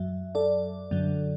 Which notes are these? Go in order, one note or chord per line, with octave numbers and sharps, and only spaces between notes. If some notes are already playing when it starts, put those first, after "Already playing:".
Already playing: F#2 F#3 E5
A4 D5
F#2 D3 F#3